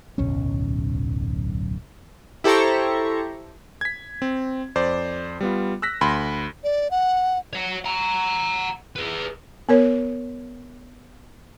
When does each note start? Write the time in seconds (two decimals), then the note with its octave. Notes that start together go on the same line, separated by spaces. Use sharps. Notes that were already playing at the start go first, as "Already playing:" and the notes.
0.18 D1 B1 F#2 C#4
2.44 E4 G4 A4 C5 A#5 C#6
3.81 G#6 B6
4.22 C4
4.75 F2 C5 D5
5.41 G3 B3 F4
5.82 E6 F#6 A#6 B6
6.01 D2 B5 C6
6.64 D5
6.91 F#5
7.53 C#5 F#5
7.85 F#5 A#5
8.96 G#4 B4
9.69 B3 A#4 C#5